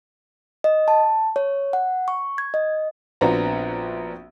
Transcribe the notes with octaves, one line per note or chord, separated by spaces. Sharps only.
D#5
A5
C#5
F#5
C#6
G#6
D#5
A#1 B3 C4 D4 F#4 A#5